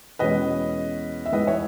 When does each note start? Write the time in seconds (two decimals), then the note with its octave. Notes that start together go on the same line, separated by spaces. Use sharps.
0.19 E2 B2 G#3 C#4 B4 D#5
1.26 E5
1.32 G#2 E3 G#3 B4 D#5
1.47 C#5 E5